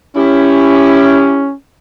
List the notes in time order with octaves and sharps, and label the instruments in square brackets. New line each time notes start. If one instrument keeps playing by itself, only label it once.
[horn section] C#4 [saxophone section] E4 G4